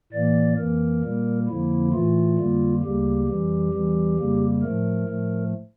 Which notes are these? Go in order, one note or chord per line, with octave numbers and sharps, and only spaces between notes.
A2 E3 A#3 D5
F2 E3 A#3 A#4
A#2 G3 A#3
F2 D3 F3 A#3 E4
A2 E3 A3 F4
F2 D3 G3 A#3
D2 C#3 G3 A#3 G4
F2 E3 G3
E2 E3 G3
F2 C#3 G3 A#3
A2 F3 A3 A#4
A2 F3 A3